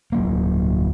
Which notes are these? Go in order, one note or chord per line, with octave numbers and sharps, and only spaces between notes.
D1 F#3 A#3